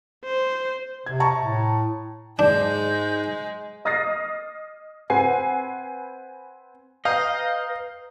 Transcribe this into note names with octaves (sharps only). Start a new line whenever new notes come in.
C5
C3 G#6
A5 A#5 C#6
A2
G#2 G#3 D4 G6
D#5 D#6 F6 A6 A#6 C7
C4 B4 F#5 G#5 C7
B4 D#5 F5 G5 A#5